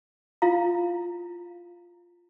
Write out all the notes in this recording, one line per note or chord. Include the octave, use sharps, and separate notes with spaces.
E4 F4 F5 A#5